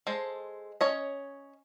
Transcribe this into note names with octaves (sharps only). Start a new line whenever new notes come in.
G#3 A4 C5
C#4 C#5 D#5